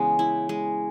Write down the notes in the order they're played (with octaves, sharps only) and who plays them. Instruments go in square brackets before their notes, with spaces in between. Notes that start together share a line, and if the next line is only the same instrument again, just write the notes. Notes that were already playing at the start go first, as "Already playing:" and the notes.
Already playing: [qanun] C#3 E3 G#3 B3
E4
G#3